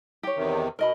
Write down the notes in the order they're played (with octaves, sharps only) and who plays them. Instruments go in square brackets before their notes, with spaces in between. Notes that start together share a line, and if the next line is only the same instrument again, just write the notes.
[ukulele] G4 C#5
[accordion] E2 C3 D#3
[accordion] B2 [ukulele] A#4 D#5 B5